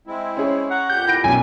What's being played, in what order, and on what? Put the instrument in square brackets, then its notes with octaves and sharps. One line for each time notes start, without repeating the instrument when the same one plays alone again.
[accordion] G#3 C4 E4
[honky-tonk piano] C#4 G#4 C#5
[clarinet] F#5 [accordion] A#5 C#6
[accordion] F2 A#2 G4 [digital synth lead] G6
[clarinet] E4 [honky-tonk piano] F#5 A#6 D7
[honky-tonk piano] B1 F#2 B2 [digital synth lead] G#5